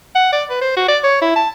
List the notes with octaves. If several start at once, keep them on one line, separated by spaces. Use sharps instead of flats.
F#5
D5
B4
C5
F#4
D5
C#5
E4
A5